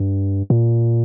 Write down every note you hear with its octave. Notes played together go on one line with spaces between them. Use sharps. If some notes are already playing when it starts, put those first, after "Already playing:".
Already playing: G2
A#2